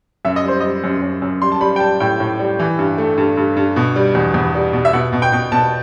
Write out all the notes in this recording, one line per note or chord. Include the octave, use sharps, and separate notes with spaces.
F#2 E5
D#5
G3 C5
G3 D#5
F#2
F#2
F#2
G3 C6
A5
G3 B5
G5
G3 A5
A2 G5
A2
G3
E3
G2
A3
G2
G2
G2
B2
G3
E2
E2
G3
B2
E5
B2 F#5
B2
G5
B2
B2 A5